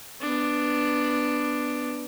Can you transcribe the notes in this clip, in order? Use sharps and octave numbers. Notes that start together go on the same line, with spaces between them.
B3 D4